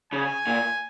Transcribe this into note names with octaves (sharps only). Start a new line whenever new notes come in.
C#3 G#5
A#2